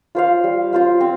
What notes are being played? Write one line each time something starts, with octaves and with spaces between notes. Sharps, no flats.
F4 C5 F5
G3
F4 C5 F5
C4